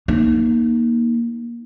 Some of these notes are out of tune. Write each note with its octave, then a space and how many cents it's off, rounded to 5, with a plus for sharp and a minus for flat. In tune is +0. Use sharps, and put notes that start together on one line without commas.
A#3 +10 D#4 +0